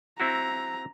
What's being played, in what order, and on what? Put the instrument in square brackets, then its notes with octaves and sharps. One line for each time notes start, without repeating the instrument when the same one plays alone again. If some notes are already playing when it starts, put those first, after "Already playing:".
[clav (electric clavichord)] C4 E4 F#4 [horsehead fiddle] A#5